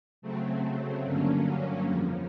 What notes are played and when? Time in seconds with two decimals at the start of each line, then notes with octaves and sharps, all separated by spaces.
0.22 C#3 F#3 A3 C4
1.04 G2 D3 F#3 A#3 C#4
1.87 F2 C#3 F3